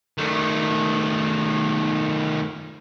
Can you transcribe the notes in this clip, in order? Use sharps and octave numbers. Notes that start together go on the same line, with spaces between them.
D#3 A3